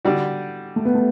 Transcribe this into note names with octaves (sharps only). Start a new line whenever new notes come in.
D3 G3 D4 F#4
A3
B3
A3